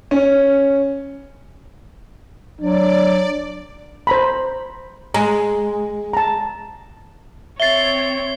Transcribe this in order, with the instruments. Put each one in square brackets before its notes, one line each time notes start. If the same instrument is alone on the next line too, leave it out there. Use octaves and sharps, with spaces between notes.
[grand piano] C#4
[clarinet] F#3 [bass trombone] D4 [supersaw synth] D5
[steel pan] C5 A#5 B5
[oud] G#3 [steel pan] A#5
[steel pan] A5 A#5
[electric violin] C4 C#5 [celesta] E5 A6 [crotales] C7 G7